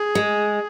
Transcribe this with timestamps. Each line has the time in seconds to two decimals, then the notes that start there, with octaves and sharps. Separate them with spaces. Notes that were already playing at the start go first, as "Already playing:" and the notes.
Already playing: G#4
0.15 G#3